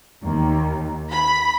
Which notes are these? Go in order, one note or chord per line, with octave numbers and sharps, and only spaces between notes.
D#2
B5